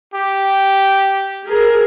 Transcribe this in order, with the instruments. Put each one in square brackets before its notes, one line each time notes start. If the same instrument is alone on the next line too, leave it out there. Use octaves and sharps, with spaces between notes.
[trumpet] G4
[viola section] G#4 A#4